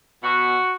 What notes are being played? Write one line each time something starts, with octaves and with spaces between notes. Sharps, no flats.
B2 F#4